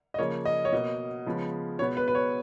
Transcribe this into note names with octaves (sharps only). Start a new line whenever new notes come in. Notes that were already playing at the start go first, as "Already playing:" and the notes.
D#5
C#3 F3 A#3 C#5
D#5
C#5
B2 A#3 D#5
C#3 F3 G#3 B3
B2 G#3 B3 C#5
B4
B4
C#5